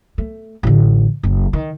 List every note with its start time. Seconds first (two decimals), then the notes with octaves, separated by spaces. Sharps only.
0.18 A3
0.63 A1 D3
1.23 F#1
1.53 D#3